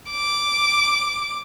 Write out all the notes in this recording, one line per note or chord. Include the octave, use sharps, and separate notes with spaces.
D6